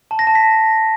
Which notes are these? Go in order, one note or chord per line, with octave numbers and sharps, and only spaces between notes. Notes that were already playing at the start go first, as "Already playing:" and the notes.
A5
A#6
A5
B6